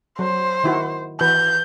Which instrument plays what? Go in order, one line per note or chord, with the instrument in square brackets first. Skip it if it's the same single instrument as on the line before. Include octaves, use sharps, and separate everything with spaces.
[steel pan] F#3 [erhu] C5
[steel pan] D#3 E4 F#4
[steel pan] E3 F#4 B4 [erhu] G6